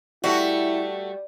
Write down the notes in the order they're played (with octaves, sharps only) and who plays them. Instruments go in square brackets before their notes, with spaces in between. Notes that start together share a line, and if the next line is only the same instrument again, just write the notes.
[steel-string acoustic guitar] G3 [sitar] A3 F#4 [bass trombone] E4